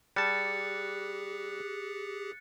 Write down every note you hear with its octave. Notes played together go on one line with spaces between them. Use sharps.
G3 G4 G#4 A5 F#6 A6 C#7